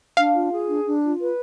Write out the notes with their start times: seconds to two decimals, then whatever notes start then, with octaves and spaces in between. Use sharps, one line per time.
0.17 D4 F5
0.35 F4
0.52 G#4
0.69 D4
0.85 D4
1.03 F4
1.20 B4